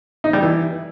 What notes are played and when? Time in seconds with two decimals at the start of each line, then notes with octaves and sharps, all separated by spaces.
0.24 D#4
0.33 G3
0.42 E3